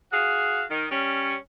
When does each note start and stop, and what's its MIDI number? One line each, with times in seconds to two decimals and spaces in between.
0.12 0.63 66
0.12 0.63 68
0.12 0.63 77
0.69 0.86 51
0.91 1.34 55
0.91 1.34 61